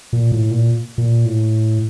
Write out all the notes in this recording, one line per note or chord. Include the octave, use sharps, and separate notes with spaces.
A#2
A2
A#2
A#2
A2